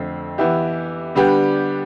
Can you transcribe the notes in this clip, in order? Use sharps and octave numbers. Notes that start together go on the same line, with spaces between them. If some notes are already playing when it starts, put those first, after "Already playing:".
Already playing: F2 D3 A3 C4
E3 B3 E4 G4
D3 G3 B3 D4 G4